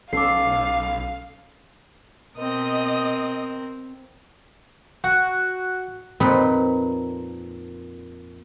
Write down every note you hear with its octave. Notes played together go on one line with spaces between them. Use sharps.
B1 C#4 A4 F5 D6 C7
B2 C4 A#4 D#5 D#6
F#4
F2 A#2 C4 D#4 A4 B4